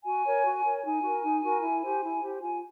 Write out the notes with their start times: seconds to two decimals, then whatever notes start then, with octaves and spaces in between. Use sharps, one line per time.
0.05 F#4 G#5
0.25 A#4 C#5
0.45 F#4
0.64 A#4 C#5
0.84 D#4 G#5
1.03 F#4 A#4
1.23 D#4
1.43 F#4 A#4
1.62 E4
1.82 G4 C5
2.02 E4
2.21 G4 C5
2.41 F4 G#5